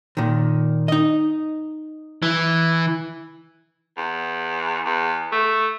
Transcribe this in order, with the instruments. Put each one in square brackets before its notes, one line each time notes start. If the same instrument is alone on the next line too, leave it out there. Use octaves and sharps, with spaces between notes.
[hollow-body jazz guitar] A#2 D#3
D#4 D#5
[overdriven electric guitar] E3
[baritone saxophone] E2
E2
A3